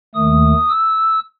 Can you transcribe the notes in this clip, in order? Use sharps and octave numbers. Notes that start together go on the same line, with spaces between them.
D#2 D#3 A3 D#6
E6